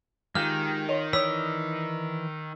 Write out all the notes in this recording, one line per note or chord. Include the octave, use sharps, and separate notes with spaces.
D#3 G#3 F4 G4 F6
F4 C#5 D#5
E3 C#5 D5 D#6 E6 B6